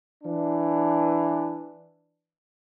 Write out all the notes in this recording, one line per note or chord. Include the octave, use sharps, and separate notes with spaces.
E3 D4